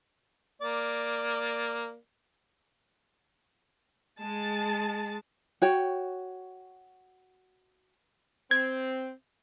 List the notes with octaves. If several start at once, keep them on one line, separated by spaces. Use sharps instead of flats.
A#3 D5
G#3 A5
F#4 C#5 G5
C4 G#6